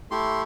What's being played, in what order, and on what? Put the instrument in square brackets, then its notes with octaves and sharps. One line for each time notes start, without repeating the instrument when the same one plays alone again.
[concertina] A3 E4 G4 C6